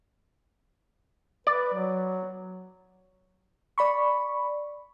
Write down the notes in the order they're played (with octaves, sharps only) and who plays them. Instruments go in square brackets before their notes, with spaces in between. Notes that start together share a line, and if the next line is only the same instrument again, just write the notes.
[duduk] B4 [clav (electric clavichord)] D5
[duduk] F#3
[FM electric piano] D5 B5 C#6